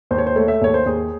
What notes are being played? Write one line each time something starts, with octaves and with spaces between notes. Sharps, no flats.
D#2 C5
C#5
C5
A3 C#5
E5
D#2 C#5
C5
D#2 G#4